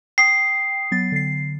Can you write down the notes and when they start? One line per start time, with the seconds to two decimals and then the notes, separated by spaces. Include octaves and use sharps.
0.18 G5 D#6 C7
0.91 F#3 B3 A6
1.12 D3 C7